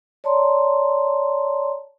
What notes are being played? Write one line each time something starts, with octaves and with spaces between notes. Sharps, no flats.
C#5 D5 A5 A#5 C6